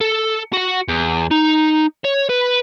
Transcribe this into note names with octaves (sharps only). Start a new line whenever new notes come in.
A4
F#4 F#5
E2
D#4
C#5
B4